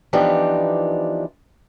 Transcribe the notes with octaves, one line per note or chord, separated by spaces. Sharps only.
E3 F3 B3 D4 D#4 G4